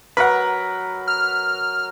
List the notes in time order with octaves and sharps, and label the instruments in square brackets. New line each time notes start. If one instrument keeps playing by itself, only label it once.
[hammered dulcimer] F#3 A#4 [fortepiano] B4 F#5
[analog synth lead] F6